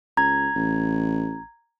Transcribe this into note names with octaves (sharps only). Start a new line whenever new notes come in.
C#2 A#5 G#6
A1